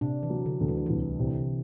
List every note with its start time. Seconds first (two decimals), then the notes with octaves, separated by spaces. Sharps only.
0.01 C3 D4
0.23 E3
0.30 F#3
0.46 D3
0.61 D2
0.68 E3
0.77 D3
0.86 C2 E3
1.19 C3